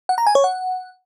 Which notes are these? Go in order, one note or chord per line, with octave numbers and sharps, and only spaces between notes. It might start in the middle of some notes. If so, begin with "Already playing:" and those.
F#5
A#5
G#5
C#5
F#5